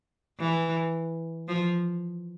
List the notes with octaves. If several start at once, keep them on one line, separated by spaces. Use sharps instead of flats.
E3
F3